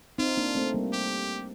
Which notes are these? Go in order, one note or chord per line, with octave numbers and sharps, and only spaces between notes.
C4 D#4 F4
A#3 D4
A3 C4
G3 A#3
G4